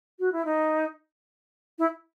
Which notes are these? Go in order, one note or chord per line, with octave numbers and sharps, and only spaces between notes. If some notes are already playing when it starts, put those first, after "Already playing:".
F#4
E4
D#4
E4